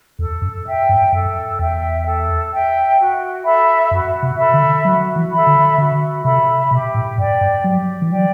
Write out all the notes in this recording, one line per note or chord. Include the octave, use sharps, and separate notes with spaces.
E2 A4
F#2
E5 G5
G2
F#2 A4
E2 E5 G5
A4
E5 G5
F#4
A4 E5 B5
F#2 F#4
C3
A4 E5 B5
D3
F#3 F#4
E3
A4 E5 B5
D3
D3 F#4
C3 A4 E5 B5
B2 G4
A2
G2 D5 G5
G2
F#3 G4
E3
F#3 D5 G5